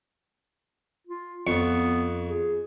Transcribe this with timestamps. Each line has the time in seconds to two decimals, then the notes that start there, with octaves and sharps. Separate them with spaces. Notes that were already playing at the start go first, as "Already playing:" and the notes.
1.07 F4
1.47 F2 B3 C#6
2.27 G#4